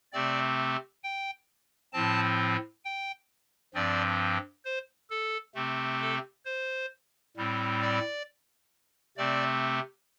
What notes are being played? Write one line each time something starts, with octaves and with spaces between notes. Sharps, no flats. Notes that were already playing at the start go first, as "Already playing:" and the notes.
C3 A3 C4 D5
G5
A2 F3 C4 A5
G5
G2 F3 C4 D5
C5
A4
C3 A3 C4
A4
C5
A2 G3 C4
D5
C3 A3 C4 D5